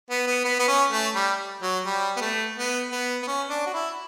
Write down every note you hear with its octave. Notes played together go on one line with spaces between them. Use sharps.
B3
B3
B3
B3
C#4
A3
G3
F#3
G3
B3
A3
B3
B3
B3
C#4
D4
F#4
E4